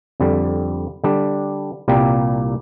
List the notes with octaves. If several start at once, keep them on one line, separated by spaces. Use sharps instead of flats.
F2 D3 G3
D3 G3 D4
C2 A#2 G3 A#3 G4